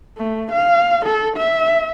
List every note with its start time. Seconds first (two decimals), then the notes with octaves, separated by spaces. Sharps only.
0.18 A3
0.52 F5
1.06 A4
1.37 E5